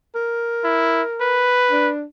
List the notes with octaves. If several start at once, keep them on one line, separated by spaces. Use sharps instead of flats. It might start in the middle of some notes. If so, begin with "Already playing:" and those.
A#4
E4
B4
D4